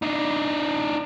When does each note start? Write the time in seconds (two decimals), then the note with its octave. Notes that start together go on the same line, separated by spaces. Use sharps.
0.02 D4 D#4